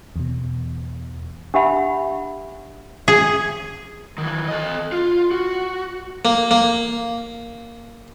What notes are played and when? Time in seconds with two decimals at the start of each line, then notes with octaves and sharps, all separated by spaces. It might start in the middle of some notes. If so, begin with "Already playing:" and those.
0.16 E2 B2
1.54 D4 G4 E5 F#5 B5
3.08 G#4
4.18 D#3 E3
4.48 A4 D#5
4.92 F4
5.31 F#4
6.25 A#3
6.51 A#3